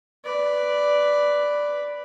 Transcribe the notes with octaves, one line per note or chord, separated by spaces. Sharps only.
B4 D5